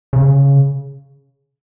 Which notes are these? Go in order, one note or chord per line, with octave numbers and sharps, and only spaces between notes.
C#3